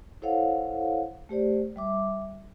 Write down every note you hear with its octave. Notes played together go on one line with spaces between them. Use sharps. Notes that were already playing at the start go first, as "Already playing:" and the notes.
E4 A4 C5 C#5 F5 F#5
A3 G4 C5 D5
G3 E5 D6